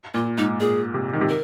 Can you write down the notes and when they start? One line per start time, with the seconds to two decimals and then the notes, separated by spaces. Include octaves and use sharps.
0.14 A#2 F4
0.38 G#2 D#4
0.60 A#2 G#4
0.94 C3
1.13 D#3
1.21 C3
1.29 A#4